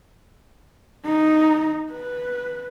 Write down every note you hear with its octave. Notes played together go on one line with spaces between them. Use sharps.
D#4
B4